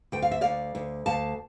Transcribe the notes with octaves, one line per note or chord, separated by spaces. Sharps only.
D2 G5
F5
E5
D2 D5 F5
D2
D2 F5 A5